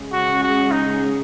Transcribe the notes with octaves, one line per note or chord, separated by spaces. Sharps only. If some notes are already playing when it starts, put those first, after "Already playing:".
Already playing: C#3 G#3 C#4 G#4
F#4
F#4
D#4